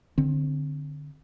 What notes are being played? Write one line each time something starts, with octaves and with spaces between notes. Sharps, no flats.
D3 C4